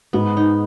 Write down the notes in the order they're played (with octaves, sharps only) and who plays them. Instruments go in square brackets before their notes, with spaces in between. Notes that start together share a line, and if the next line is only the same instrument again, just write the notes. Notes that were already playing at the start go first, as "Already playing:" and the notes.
[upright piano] G#2 [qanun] B3
[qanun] D#4